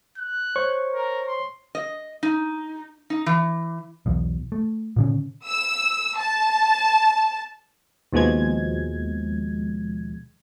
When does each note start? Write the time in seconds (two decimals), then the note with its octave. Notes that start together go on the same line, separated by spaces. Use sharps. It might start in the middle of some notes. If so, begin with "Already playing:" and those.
0.17 F#6
0.56 C5 C#5 C#6
0.93 A#4
1.27 C6
1.75 D#5
2.23 D#4
3.10 D#4
3.26 E3
4.06 B1 E2
4.52 A3
4.96 A#2 D3 C#4
5.45 E6
6.18 A5
8.13 D#2 B2 F3 G#3 G#6